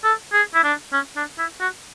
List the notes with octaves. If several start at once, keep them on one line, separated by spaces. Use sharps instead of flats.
A4
G#4
E4
D4
C#4
D4
E4
F#4